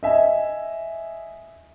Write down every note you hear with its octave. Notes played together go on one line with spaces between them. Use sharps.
D#5 E5 G#5